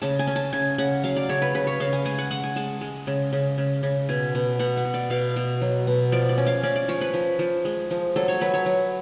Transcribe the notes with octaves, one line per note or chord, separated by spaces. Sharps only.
C#3 A5
G#5
C#4
A5
C#3 G#5
C#3 F#5
F#3 F5
D5
C#3 C#5
B4
C#3 B4
C#5
C#3 F5
G#5
G#3 G#5
F#5
G#3 F#5
G#5
G#3 A5
G#3
C#3
C#3
C#3
C#3
B2 G#5
B2
B2 F#5
F#5
B2
D5
B2 F5
B2
F#3
B2
F3 D5
D5
C#4
F5
C#4 D5
D5
F3 C#5
B4
F3
F3
G#3
F3
F#3 A4
C#5
F#3 B4
C#5
F#3